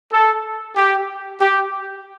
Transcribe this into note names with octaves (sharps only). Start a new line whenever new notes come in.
A4
G4
G4